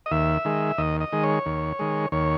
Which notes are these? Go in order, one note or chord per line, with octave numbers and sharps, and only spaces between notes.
D#5
D#2 E5
D#3 G#3
D#2 D#5
D#5
D#3 G#3
C#5
D#2
D#3 G#3
D#2 C#5